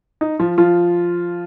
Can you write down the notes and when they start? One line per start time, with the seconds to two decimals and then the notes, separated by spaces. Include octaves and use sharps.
0.21 D#4
0.39 F3 F4
0.58 F3 F4